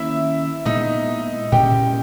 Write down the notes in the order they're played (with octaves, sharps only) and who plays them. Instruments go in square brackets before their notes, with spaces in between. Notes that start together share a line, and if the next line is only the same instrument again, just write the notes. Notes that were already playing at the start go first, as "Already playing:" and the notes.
Already playing: [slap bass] D#3 A#3 C#4 [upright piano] E4 E5
[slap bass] A#2 G#3 B3 [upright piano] D#4 D#5
[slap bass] A#2 G#3 C#4 [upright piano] G4 G5